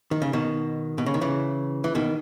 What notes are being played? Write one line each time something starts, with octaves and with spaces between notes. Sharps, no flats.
D#3
C#3
B2 D#3
B2
C#3
D#3
C#3 E3
E3
B2 D#3